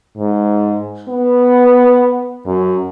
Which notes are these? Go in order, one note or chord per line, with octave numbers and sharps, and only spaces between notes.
G#2
B3
F#2